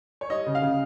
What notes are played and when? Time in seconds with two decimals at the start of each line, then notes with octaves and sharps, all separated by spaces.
0.21 C#5
0.30 G3 D#5
0.46 C#3
0.55 F5
0.62 C#3